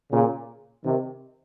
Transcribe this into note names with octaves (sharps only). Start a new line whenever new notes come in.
A#2 C#3
C3 D#3